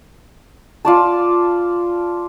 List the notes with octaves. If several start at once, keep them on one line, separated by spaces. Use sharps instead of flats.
F4 D5 A5